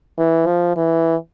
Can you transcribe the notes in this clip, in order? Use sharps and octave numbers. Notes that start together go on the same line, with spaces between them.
E3
F3
E3